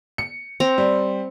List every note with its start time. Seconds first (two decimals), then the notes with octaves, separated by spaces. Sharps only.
0.18 C#7
0.60 C4 A#5
0.78 G3